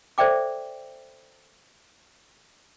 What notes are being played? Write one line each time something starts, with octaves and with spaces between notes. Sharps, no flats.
A4 C5 D5 E5 G5 D6